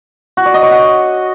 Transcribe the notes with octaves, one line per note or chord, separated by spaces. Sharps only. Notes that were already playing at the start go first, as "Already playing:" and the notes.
F#4
D5
D#5
C#5
F#5